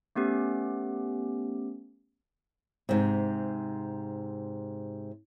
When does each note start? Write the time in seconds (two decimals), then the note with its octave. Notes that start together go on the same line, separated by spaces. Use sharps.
0.16 A3 B3 C#4 G4
2.89 G#2 C3